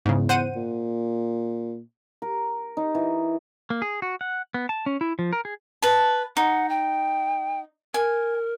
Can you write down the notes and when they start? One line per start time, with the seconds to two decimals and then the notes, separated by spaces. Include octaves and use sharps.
0.06 E2 G#2 C#3
0.29 C5 F#5 D#7
0.56 A#2
2.22 A#4
2.77 D#4
2.95 E3
3.70 A#3
3.82 G#4
4.02 F#4
4.21 F#5
4.54 B3
4.69 A5
4.86 C#4
5.01 E4
5.19 F3
5.33 A#4
5.45 G#4
5.82 B4 A5
6.37 D#4 F#5
6.70 G5
7.94 A#4 G#5